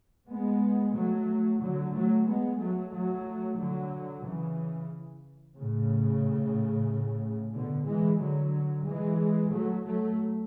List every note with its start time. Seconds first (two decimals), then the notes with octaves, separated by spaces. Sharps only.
0.29 G#3 B3
0.95 F#3 A3
1.61 D3 F#3
1.94 F#3 A3
2.27 G#3 B3
2.60 F#3 A3
2.93 F#3 A3
3.59 D3 F#3
4.24 C#3 E3
5.57 A2 C#3
7.54 B2 D3
7.87 E3 G#3
8.20 D3 F#3
8.86 E3 G#3
9.52 F#3 A3
9.84 F#3 A3